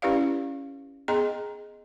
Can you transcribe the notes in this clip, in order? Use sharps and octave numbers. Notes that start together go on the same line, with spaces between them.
C#4 E4 G4 B4 D5 F5
B3 G#4 D#5 A#5 C6